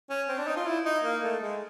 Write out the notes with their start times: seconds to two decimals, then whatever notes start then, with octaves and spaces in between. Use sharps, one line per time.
0.10 C#4
0.29 C4
0.38 D4
0.47 D#4
0.56 F4
0.66 E4
0.86 D#4
1.04 A#3
1.23 A3
1.41 G#3